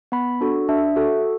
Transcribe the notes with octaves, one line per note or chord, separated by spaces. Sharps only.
B3 B5
D4 F#4 A4
D4 E5
F#4 A4